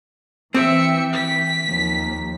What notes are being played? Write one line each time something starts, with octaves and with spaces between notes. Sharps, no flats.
E3 C4 E5 G5 C#7
B6
D#2 F3